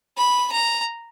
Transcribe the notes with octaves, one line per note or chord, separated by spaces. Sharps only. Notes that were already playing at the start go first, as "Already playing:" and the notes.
B5
A#5